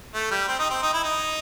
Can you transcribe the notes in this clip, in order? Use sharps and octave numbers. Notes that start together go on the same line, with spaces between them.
A3
G3
C4
D#4
C4
D#4
E4
D#4